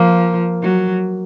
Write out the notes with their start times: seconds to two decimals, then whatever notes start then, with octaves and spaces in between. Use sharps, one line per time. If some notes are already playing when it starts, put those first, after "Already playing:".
Already playing: F3 A#3
0.62 F#3